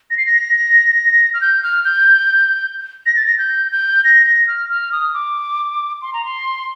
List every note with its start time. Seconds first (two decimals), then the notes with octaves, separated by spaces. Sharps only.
0.10 A#6
0.17 C7
0.26 A#6
1.34 F6
1.41 G6
1.63 F6
1.85 G6
3.06 A#6
3.16 A6
3.26 A#6
3.38 G6
3.72 G6
4.04 A#6
4.26 A#6
4.48 F6
4.70 F6
4.92 D#6
5.14 D6
6.02 C6
6.13 A#5
6.25 C6